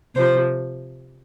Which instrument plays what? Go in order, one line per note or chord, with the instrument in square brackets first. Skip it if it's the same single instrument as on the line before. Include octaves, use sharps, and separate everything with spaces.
[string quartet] C3 F3 C5